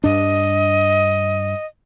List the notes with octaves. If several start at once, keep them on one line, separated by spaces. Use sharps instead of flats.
G2 D4 D#5